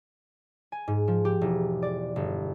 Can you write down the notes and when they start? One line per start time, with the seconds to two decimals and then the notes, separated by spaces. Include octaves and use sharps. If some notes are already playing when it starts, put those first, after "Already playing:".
0.72 G#5
0.88 G#2
1.08 F3
1.25 G4
1.41 E1
1.83 D5
2.16 G1